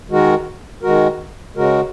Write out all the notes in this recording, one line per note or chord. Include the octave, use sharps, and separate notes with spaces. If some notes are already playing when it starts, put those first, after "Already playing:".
D#3 G#3 F#4 A#4
D#3 G#3 F#4 A#4
C#3 G#3 F#4 A#4